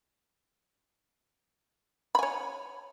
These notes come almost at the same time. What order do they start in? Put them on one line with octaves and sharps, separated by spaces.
B5 G#5 C#5